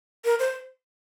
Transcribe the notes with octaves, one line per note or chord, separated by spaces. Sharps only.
A#4
C5